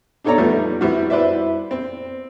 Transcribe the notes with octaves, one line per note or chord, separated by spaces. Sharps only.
D4 D#4 A4 C#5 D5 A#5
F3 G3 A3 B3
G3 B3 C4 E4 F#4
E4 B4 C5 D5 E5
C4